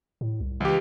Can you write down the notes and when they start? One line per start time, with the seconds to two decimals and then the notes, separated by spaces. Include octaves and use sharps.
0.21 A2
0.40 C2
0.60 C#2 E3 G4